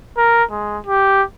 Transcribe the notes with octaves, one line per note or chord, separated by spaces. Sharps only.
A#4
G#3
G4